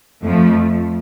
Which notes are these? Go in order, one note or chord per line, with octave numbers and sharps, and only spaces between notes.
F2 F3 A3